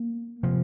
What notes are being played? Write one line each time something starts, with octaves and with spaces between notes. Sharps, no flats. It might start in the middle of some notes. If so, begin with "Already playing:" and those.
Already playing: A#3
C3 F3